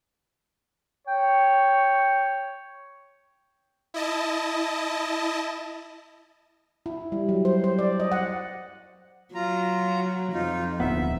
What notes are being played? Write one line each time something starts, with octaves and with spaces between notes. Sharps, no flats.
C#5 G5
E4 D#5 A5
E4
G3
F#3
C5
C5
D5
D#5
F#5
F#3 F4 A#5
F2 D#4 F4
D1 D#2 B3 E5